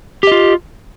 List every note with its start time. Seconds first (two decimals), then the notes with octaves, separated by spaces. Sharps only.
0.23 G4
0.27 D#5
0.31 F4